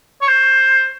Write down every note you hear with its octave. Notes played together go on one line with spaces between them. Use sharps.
C#5
C5